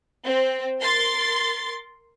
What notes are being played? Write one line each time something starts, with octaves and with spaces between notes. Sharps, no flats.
C4
A#4 C6 A6